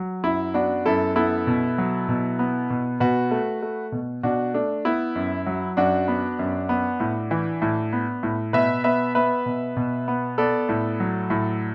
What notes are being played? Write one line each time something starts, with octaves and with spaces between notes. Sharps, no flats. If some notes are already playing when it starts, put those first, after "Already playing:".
Already playing: F#3
F#2 E4
B3 D4 F#4
F#2 E4 A4
B3 E4 A4
B2
F#3
B2
B3
B2
B2 F#4 B4
A3
A3
B2
B2 D4 F#4
A3 D4
B3 E4
F#2
F#3
F#2 D4 F#4
B3
F#2
B3
A2
E3
A2
B3
A2
B2 B4 E5
B3 B4 E5
B3 B4 E5
B2
B2
B3
B3 A4 D5
A2
F#3
A2